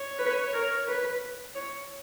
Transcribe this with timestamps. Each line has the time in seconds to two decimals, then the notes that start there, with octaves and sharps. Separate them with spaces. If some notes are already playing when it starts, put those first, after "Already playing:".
Already playing: C#5
0.19 B4
0.53 A#4
0.87 B4
1.55 C#5